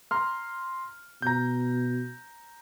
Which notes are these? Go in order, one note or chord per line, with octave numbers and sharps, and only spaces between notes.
A#5 C6 F6
B2 A#5 G6